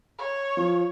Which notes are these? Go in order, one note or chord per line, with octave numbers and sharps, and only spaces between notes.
C#5
F3